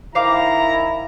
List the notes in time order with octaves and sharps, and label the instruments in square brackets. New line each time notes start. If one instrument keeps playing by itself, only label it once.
[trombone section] D#3 E4 [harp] C5 F5 D6 [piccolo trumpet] A#5